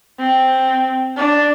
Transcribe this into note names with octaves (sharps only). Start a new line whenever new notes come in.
C4
D4